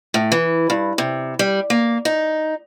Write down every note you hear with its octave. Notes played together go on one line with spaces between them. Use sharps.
A2
E3
G2
C3
G3
A#3
D#4